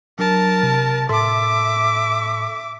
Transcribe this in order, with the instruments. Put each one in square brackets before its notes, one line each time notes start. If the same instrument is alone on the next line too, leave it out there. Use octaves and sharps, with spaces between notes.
[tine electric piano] F#3 D4 [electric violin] A#4 A5
[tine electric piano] C3
[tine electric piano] A2 A4 C6 [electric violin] E5 D6